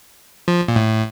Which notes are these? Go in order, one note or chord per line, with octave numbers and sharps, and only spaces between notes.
F3
A#2
A2